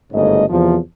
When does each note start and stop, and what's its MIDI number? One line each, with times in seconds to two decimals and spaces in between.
0.13 0.43 31
0.13 0.43 44
0.13 0.43 49
0.13 0.43 57
0.13 0.43 75
0.49 0.76 40
0.49 0.76 48
0.49 0.76 53